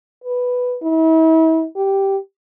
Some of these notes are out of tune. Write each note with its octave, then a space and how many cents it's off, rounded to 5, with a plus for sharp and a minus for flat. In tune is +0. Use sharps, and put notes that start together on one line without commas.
B4 +0
E4 -40
G4 -5